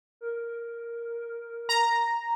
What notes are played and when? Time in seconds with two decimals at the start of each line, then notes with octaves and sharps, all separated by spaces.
0.21 A#4
1.69 A#5